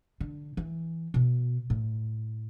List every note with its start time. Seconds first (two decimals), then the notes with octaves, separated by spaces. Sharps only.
0.21 D3
0.57 E3
1.14 B2
1.70 A2